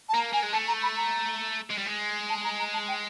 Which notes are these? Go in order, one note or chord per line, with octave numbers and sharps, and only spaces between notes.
A5
A#3 A#5
A#3 G#5
G#3
A3 A5
A#5
B5
A#5
G#3
G3
G#3
A5
A#5
A#5
A5
G5